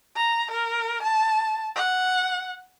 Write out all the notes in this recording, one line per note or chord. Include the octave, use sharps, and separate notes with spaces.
A#5
A#4
A5
F#5